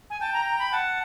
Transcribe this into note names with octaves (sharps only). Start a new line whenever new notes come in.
G#5
G5 A5
A#5
A#5
B5
F#5 A5